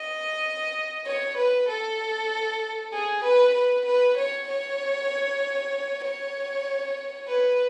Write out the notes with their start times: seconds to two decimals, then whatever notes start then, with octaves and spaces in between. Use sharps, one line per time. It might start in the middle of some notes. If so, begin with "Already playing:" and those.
Already playing: D#5
1.06 C#5
1.37 B4
1.69 A4
2.93 G#4
3.24 B4
3.55 B4
3.86 B4
4.18 C#5
4.48 C#5
6.05 C#5
7.28 B4